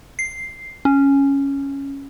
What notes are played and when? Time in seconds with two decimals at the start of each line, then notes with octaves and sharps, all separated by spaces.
0.19 C7
0.85 C#4